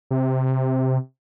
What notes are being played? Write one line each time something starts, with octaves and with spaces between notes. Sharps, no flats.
C3